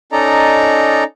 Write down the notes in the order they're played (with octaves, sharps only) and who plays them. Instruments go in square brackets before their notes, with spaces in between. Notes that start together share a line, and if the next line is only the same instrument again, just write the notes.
[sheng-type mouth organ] C#4 D#4 A4 D5 D#5 A#5